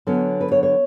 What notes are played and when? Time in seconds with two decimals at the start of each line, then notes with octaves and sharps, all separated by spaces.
0.07 D3 F#3 B3 C#4
0.41 B4
0.52 C#5
0.63 C#5